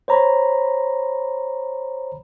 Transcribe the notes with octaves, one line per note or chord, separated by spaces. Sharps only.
C5 C#5 A#5 B5